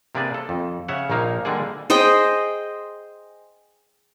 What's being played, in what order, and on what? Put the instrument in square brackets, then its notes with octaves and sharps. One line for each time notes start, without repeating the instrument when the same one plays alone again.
[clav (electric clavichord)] C3 A#3 D4 G#4 B4 D5
A4
F2
C#3 C#5 E5 F#5
A#1 A#2 A#3 D#4 F5
D3 G3 G#3 A#3 G#4
[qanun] G#4 C5 D#5 G5